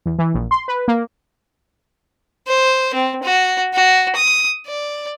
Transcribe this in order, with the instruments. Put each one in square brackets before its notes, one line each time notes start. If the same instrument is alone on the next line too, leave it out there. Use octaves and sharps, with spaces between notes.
[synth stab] E2
E3
A#1
C6
B4
A#3
[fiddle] C5
C4
F#4
F#4
D#6
D5